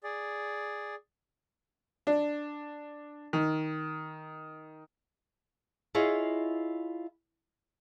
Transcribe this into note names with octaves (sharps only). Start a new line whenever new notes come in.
G#4 D5
D4
D#3
E4 F4 G#4 C#5 D#5 F5